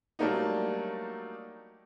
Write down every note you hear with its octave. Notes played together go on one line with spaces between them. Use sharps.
F#3 G3 A3 A#3 D4 D#4